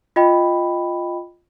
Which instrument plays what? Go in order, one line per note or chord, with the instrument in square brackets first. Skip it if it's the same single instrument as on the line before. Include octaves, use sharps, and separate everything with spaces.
[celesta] F4 D#5 G5 B5